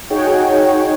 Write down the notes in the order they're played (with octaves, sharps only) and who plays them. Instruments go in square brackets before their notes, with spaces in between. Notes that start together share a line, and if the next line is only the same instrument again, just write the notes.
[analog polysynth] D#4 F#4 G#4 C#5 G5